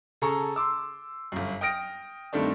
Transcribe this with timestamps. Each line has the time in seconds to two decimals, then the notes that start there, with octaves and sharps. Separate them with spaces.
0.22 C#3 G#4 A4 A5 A#5 C#6
0.56 C6 D6 E6
1.32 G1 F#2
1.61 G5 D#6 F6 A#6 D7
2.33 G2 D#3 A3 C4 D4